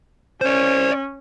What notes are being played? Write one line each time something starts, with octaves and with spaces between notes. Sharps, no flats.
C#4 C5 D5